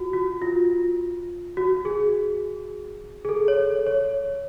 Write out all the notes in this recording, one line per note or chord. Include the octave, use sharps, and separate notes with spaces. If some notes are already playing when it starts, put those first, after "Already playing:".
Already playing: F4 F#4
F#4
F4
F#4
G#4
G#4
A4
C#5
C#5